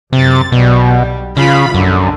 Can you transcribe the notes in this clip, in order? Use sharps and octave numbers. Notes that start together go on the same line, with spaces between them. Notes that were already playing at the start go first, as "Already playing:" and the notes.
F#2 C3 A6
B1 B2 G3
C#3 F4 F5 B5
A#1 F#2 D3